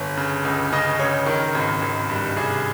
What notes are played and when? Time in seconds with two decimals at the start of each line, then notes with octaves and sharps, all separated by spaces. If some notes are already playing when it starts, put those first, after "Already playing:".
Already playing: G1 C#5
0.17 C#3
0.45 C#2
0.72 C#3 D#5
0.99 C#2 C#5
1.26 D#3 A#4
1.55 G#1
1.82 G#1
2.10 G2
2.37 C2 G#4